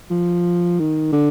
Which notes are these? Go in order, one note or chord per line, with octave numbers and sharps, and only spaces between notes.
F3
D#3
D3